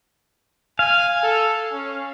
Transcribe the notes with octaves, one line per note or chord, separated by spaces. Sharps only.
F5 G#5
A4
C#4